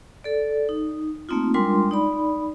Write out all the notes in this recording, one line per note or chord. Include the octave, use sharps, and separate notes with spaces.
A4 D5
D#4
A3 A#3 C4 D#4 F4
G3 G#3 D4 F4 A#4 C6
D#4 D5 B5